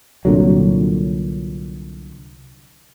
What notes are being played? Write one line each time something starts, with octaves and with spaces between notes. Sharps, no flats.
C2 A#2 D3 F#3